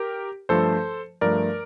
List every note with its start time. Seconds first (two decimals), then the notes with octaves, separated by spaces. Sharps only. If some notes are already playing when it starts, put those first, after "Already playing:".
Already playing: G4 A#4
0.49 G2 F3 A3 A4 C5
1.21 G2 F3 A3 A#4 D5